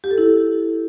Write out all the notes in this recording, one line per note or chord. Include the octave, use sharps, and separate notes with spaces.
G4
A4
E4